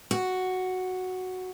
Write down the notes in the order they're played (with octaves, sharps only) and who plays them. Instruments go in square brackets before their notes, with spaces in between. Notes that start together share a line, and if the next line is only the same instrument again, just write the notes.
[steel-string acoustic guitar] F#4